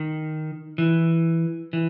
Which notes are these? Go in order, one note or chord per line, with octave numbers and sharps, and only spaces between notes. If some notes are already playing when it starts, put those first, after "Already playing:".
Already playing: D#3
E3
E3